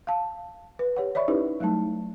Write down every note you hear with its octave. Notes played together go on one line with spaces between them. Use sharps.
F5 A5
B4
G4 C#5 F#5
C#5 D5 E5 B5 C#6
C#4 D#4 E4 G4 B4 C5
F#3 G3 A3 D#4 A5